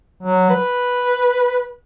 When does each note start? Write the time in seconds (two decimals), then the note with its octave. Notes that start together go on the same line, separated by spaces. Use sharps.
0.23 F#3
0.50 B4